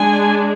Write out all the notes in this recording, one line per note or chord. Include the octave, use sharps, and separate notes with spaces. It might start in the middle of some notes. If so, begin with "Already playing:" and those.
Already playing: G#3 D4 G#5